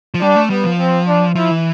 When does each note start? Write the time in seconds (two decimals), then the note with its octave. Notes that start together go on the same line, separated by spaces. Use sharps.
0.14 F3
0.21 G3 D4
0.36 A3
0.50 G3 B3
0.64 F3
0.79 C4
1.07 D4
1.35 F3 E4
1.51 E3